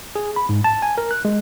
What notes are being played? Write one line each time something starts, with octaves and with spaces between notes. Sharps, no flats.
G#4
B5
G#2
A5
G#5
A#4
F#6
G#3